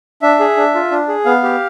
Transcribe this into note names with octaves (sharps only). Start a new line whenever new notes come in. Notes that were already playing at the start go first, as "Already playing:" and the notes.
D4 E5
G#4
D4
F4
D4
G#4
B3 F5
G4